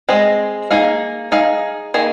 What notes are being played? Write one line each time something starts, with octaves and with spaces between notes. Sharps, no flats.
G#3 C4 G#4 D#5
A#3 D#4 G#4 F5
D#4 G#4 F5
D#3 A#3 G#4